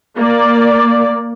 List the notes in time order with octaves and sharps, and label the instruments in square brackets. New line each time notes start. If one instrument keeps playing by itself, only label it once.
[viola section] A#3 D5